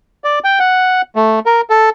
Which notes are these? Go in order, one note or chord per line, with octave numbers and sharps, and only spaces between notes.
D5
G5
F#5
A3
A#4
A4